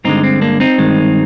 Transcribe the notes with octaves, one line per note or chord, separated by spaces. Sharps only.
G2 D3 G#3 C4 D#4
C4
A#3 D4
C4 D#4
G2 D#3 G#3